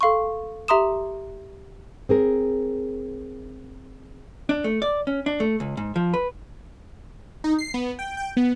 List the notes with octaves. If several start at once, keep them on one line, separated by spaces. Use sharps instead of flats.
A4 F5 C6 C#6
G4 E5 A#5 C6 D#6 E7
C4 G#4 A#4
D4
A3
D5
C#4
D4
A3
C#2
G#2
F3
B4
D#4
C7
B3
G5
G5
B3